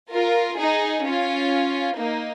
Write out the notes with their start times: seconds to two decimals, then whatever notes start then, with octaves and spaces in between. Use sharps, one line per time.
0.11 F4 A#4
0.57 D#4 G#4
1.03 C#4 F4
1.96 A#3 D#4